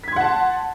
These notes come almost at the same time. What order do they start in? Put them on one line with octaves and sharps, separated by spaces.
B6 G#6 C6 F#5 A5